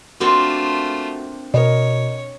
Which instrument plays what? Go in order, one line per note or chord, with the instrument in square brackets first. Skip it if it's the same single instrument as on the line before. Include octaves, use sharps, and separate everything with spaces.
[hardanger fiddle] A3 F4 [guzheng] A#3 C4 D4 [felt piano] F#4
[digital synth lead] B2 [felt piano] A#4 D#5 [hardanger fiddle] C#5